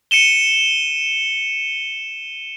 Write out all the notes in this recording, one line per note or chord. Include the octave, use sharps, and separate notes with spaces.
C#7 D#7 E7 G7